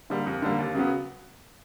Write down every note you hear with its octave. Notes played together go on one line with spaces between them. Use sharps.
D3 G3 A#3
F2
D3 G3 A#3
D#2
C#3 F#3 B3